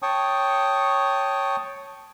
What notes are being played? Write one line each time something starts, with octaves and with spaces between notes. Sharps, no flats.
C#5 G5 A5 C#6 D#6